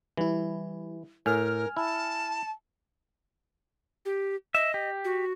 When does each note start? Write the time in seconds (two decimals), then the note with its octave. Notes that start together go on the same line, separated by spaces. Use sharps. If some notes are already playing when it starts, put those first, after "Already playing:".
0.17 E3 G3 E4
1.26 A2 A#4 G#5 F6
1.77 E4 A5
4.05 G4
4.55 D#5 E5
4.74 G4
5.04 F#4